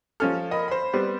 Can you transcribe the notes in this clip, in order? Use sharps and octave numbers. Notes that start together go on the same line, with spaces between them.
F3 C#4 A4 F6
A#4 D#5 B5
C5 B5
G3 B3 C4